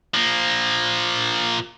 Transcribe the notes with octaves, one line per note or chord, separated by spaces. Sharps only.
F3 A#3